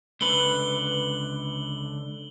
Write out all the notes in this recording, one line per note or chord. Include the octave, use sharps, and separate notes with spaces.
C#2 D3 B4 F#7 G7